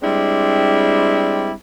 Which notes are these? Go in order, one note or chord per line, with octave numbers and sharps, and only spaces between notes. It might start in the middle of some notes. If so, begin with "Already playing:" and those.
G3 G#3 C4 D4 E4